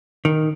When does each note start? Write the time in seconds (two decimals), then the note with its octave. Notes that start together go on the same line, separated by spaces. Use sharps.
0.25 D#3